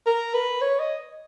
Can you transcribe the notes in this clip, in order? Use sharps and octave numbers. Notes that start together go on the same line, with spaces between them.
A#4
B4
C#5
D#5